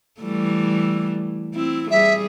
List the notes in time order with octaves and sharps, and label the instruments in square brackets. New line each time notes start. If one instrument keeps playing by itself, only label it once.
[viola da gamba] E3 G3 A3
C4 E4
[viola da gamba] G3 G#4 [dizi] E5